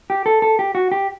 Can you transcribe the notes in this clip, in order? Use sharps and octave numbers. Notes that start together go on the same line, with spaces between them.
G4
A4
A4
G4
F#4
G4